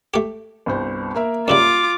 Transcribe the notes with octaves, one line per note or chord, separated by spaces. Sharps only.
A3 G4
G1 C2 C5
A#3 A#4 E5
F#2 C#3 G3 F4 D6